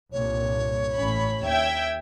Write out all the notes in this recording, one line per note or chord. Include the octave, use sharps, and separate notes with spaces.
C2 G2 A#2 C#5
A1 C#4 B5
D#2 E5 G5 G#6